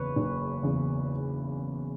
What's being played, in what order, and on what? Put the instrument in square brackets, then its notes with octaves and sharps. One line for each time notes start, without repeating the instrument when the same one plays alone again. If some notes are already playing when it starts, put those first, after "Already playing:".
Already playing: [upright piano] F#1 E2 C#3 [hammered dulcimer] B4 C#5
[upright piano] F#1
E2 C#3